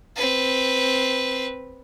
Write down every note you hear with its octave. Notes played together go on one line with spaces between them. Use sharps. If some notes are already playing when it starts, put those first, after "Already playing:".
C4 B4